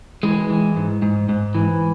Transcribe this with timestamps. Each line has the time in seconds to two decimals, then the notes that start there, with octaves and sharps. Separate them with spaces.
0.23 E3 G#3
0.50 E3
0.76 G#2
1.02 G#2
1.29 G#2
1.55 E3